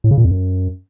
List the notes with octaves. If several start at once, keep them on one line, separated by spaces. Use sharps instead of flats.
A2
C#3
A#2
F2
F#2